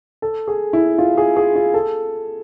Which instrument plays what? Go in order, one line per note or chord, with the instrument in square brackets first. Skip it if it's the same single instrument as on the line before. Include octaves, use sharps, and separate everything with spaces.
[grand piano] A4
G#4
E4
F4
G#4
G#4
F4
A4